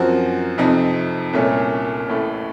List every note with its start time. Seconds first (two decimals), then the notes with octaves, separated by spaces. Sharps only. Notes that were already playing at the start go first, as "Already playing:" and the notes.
Already playing: F#2 F3 C4 F#4 A#4
0.58 F2 C3 F3 C4 D#4
1.33 C2 A#2 A3 C#4
2.08 A1 A2 A3